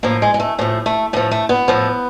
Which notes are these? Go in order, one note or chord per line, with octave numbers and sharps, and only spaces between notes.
A2 F3 A#3
G#3
G#3
A3
A2 F3 A3
A3
A2 F3 A3
A3
B3
A2 F3